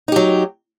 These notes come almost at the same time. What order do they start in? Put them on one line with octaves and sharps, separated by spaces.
D#4 G4 F#3